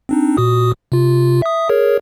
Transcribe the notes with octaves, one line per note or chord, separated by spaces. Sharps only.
C4 D4 D#4
A#2 F#4 D#6
C3 F4
E5 D#6
G#4 A#4 C#5